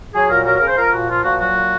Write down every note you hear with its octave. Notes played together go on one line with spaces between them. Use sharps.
F#3 G#4
A#2 A#4
F#3 A#4
C#3 A#4
C5
F3 A#4
A#2 F#4
F3 F4
A#2 F#4
F#3 F#4
A#2